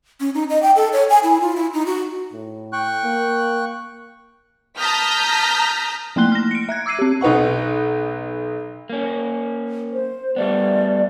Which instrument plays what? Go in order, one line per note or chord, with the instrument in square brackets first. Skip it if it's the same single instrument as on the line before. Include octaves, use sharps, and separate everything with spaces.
[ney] C#4
D#4
D#5
G5
A4
C#5
G#5
E4
F4
E4
D#4
F#4
[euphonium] A2
[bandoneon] G5 C#6 F#6
[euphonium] A#3
[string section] A5 A#5 D#6 F6 G6 B6
[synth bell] F3 A3 A#3 C6 F#6 G7
F6 A#6
C#7 D7
E5 F#6 G#6
D6 E6 G#6 C7 D#7
C4 G4
[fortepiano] B1 D#4 B4 F#5 C#6
[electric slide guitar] A#3 C#4
[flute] C5
[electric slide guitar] G3 A3 B3 [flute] D5